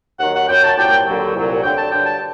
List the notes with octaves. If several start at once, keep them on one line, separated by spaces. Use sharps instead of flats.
D#2 D#3 F#3 F#5
F#5
F#2 F#3 G5
A5
C2 A#2 F#3 G5
D#2 D3 F#3
C2 A#2 F#3
D2 D3 F#3 G5
A5
G2 D3 F#3 G5
A5